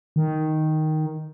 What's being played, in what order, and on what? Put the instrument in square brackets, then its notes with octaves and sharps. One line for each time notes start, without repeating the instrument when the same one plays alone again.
[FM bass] D#3